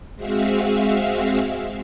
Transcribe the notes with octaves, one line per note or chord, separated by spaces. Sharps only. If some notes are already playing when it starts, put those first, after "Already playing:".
G#3 C4 F#4 G#4 E5 F5